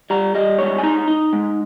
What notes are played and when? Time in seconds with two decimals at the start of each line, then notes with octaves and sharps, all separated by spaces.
0.10 G3 A#5
0.35 G3 D#5
0.58 G#2 C#5
0.78 G#5
0.83 D#4 A#5
1.08 D#4
1.33 G#3